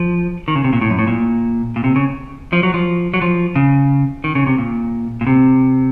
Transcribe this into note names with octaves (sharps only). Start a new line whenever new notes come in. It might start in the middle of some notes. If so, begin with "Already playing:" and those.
Already playing: F3
D#3
C#3
C3
A#2
A2
F#2
A2
A#2
A#2
C3
C#3
F3
F#3
F3
F#3
F3
C#3
D#3
C#3
C3
A#2
A#2
C3